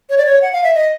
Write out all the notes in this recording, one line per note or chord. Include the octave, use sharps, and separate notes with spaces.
C#5
D5
C#5
F#5
F5
E5
D#5